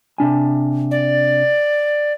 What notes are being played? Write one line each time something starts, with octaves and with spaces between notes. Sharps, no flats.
C3 D4 G#5
D5